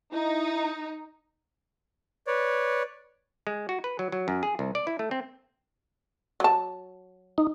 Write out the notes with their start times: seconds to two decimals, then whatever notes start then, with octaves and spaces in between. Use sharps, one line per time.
0.12 D#4 E4
2.27 B4 C#5 D5
3.47 G#3
3.69 F#4
3.84 B4
3.99 F#3
4.12 F#3
4.28 F#2
4.43 G#4
4.59 C2
4.75 D5
4.87 E4
4.99 A3
5.11 C4
6.40 F#3 A5
7.38 D#4